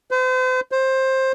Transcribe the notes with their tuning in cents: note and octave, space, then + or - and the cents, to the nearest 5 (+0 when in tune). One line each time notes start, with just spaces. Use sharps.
C5 -40
C5 +15